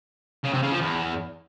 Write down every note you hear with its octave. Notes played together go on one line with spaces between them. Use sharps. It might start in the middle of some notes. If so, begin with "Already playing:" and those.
C#3
C3
C#3
F3
E2